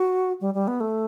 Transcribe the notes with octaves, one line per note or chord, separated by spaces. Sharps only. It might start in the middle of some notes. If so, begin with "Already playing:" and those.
Already playing: F#4
G3
G3
B3
A3